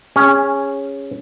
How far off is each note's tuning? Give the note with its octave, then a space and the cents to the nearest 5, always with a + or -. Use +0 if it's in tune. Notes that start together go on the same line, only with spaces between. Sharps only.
C#4 +0 G#4 -20